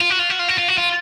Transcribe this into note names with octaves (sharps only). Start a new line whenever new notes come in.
F4
F#4
F4
F#4
F4
F#4
F4
F#4
F4